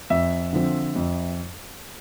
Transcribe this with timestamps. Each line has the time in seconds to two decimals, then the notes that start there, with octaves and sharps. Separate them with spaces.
0.10 F2 E5
0.53 D3 F3 C4
0.96 F2